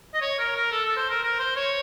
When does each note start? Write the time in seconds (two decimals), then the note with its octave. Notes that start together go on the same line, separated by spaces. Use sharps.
0.14 D#5
0.21 C#5
0.39 A#4
0.56 A#4
0.72 A4
0.85 A4
0.97 C5
1.09 A#4
1.23 A#4
1.40 C5
1.56 C#5